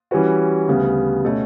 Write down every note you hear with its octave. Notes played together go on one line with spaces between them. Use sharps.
E3 G3 C#4 F#4 B4
D2 C#3 G3 B3
B2 A3 C#4